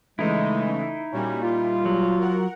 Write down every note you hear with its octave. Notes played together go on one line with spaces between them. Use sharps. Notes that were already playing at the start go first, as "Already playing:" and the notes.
C#3 E3 G#3 A3 D#4 E4
A#2 G3 C#4 F#4
F4
F#3
A#4 F#5